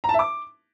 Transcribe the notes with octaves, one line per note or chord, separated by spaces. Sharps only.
A#5
A5
E5
D6